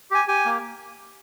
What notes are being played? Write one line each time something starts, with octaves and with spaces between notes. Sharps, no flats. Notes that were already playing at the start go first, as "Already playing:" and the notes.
G4 G#5
G4 G#5
A#3